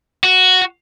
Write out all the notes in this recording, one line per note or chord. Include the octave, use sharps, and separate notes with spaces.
F#4